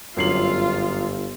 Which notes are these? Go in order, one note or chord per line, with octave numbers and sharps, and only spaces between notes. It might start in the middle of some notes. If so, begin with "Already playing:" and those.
G1 F#2 F4 C7 F#7